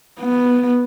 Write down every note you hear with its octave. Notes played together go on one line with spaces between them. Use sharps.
B3